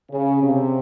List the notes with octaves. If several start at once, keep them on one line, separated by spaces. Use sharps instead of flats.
C#3
C3